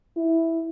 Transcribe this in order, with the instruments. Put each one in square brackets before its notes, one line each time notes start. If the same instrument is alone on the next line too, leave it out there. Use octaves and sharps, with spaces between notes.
[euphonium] E4